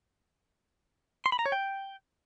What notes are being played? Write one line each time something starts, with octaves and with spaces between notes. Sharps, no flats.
C6
B5
A#5
C#5
G5